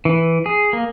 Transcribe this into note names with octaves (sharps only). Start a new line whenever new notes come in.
E3
G#4
A#3